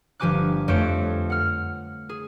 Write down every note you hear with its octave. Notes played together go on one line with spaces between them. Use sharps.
G1 F3 G4 G#5 D6 F#6
F2 A3 G4 B4 C#5 D7
F#5 F6
G#4